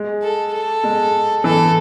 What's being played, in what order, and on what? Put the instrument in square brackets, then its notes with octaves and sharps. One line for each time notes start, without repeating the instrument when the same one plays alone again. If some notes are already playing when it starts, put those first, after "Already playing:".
Already playing: [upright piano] G#3
[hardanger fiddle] A4
A4
[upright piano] G#3
[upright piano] E3 [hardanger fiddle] A4